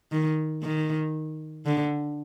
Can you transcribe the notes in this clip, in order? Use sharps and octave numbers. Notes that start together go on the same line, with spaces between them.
D#3
D#3
D3